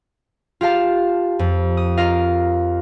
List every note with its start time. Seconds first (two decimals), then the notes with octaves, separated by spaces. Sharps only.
0.61 F4 G4 F5 A5
1.39 F2
1.77 D#6
1.97 F4 A#4 D#5 F5